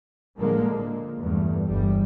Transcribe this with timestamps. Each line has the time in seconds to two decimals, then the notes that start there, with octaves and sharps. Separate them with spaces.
0.37 A2 D3 F3 G#3 A#3
0.70 A#2
1.20 E2 G2 A3
1.66 G1 E2 G3